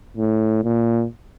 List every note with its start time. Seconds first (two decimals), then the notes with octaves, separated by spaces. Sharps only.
0.17 A2
0.63 A#2